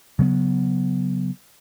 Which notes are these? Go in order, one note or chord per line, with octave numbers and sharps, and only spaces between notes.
C#3 F#3 B3